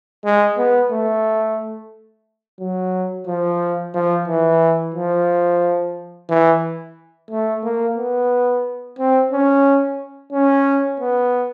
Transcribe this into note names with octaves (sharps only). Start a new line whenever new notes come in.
G#3
B3
A3
F#3
F3
F3
E3
F3
E3
A3
A#3
B3
C4
C#4
C#4
B3